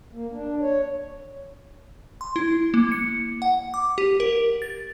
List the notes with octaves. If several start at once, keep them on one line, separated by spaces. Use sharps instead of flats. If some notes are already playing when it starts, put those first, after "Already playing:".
A#3
D4
C#5
C6
E4
A#3
C#7
F#5
D6
G4
A#4
A6